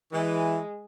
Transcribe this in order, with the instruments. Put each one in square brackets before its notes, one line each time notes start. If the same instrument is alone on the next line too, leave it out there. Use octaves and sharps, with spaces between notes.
[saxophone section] E3 [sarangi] G#3